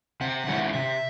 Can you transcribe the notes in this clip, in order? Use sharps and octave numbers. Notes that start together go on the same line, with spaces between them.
C3 F#5
D#3 G#3 C#4 E4
C3 E5